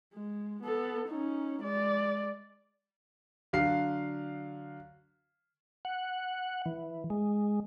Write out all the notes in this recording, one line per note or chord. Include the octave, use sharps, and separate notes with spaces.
G#3
B3 A4
C#4 D#4
G#3 D5
D3 F#3 F5 C7
F#5
E3
G#3